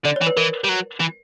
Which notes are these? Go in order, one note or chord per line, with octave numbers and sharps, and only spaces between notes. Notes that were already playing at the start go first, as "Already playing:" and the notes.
D3 D5
C#5
E3
B4
E3 A#4
G3
F#3
E3